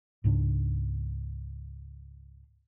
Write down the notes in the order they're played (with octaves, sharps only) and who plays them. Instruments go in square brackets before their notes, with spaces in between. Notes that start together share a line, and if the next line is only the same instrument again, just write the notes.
[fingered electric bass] C#2 G#2 C#3 D4